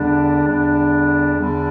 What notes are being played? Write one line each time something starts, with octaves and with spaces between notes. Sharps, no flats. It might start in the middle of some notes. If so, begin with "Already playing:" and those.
Already playing: E2 D3 G3 D4
E2 D3 G3 D4
E2 D3 G3 D4